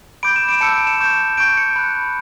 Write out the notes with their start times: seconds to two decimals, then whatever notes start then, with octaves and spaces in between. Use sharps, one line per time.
0.23 B5 D6 G6 D7
0.36 E7
0.49 D7
0.61 A5 E6 G6 C#7
0.74 D7
0.87 E7
1.00 C#6 G6
1.37 C#6 G6 D7
1.57 C#7
1.76 B5 F#6